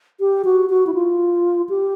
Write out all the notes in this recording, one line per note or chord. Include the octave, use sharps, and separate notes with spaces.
G4
F#4
F#4
E4
F4
G4